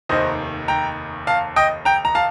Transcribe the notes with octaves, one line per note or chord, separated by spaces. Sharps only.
F1 D#2 D#3 C5 D#5
G5 A#5
F5 A5
D#5 G5
G5 A#5
A#5
F5 A5